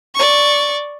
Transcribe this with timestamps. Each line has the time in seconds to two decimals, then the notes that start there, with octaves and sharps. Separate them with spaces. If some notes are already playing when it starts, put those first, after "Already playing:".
0.15 D5 C#6